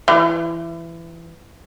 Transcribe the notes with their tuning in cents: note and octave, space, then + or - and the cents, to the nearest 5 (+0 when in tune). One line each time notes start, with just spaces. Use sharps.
E3 +20